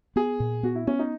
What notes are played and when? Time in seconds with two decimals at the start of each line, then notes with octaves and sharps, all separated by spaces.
0.16 B3 G#4
0.40 A#2
0.63 B3 F#4
0.75 E4
0.87 B3 C#4
0.99 D#4